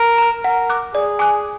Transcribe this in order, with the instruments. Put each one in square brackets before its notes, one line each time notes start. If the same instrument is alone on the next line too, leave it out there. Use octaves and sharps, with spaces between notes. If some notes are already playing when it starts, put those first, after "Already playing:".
Already playing: [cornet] A#4
[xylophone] A#5 F6
[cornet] A#4 [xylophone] F#5
[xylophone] D6 F#6
[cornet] G#4 [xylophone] D5
[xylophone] G#5 D6 F#6